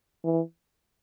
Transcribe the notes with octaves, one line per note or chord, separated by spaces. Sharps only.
E3